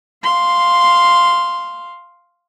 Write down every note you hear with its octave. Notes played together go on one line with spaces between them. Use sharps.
F5 C6